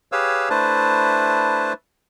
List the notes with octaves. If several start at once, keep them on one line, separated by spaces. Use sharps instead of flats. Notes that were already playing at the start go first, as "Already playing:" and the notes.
G4 G#4 B4 C#5 F5 E6
A3 D4 E4 B4 C5 A5